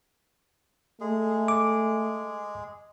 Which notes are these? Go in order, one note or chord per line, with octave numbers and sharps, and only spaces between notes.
G#3 A3 G#4
D6